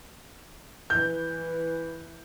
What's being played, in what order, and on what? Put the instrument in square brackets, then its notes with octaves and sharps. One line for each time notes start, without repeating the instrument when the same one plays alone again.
[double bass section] E3 [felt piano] G6